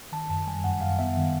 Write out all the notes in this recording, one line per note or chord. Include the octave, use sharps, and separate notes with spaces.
D#3 A5
F#2 A5
G3 G#5
F#2 F#5
F#2 F5
B3 E5
D#3